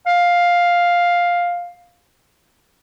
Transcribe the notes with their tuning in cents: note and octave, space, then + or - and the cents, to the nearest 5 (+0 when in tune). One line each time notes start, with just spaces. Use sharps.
F5 +5